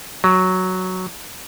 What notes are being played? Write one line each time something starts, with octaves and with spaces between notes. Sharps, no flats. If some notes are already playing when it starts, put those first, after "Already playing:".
F#3